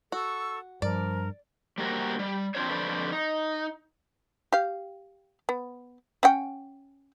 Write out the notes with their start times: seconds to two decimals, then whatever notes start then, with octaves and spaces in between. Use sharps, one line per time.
0.12 F#4 A4 C#6 E6
0.82 G2 F3 A#4 D5
1.78 G3 A#3 F#4 A#4 C5
2.19 G3
2.55 C4 D4 D#4 F4 C5 C#5
2.67 F2 D3 B4 C5 D5
3.12 D#4
4.52 G4 F5
5.49 B3
6.23 C#4 F#5 G5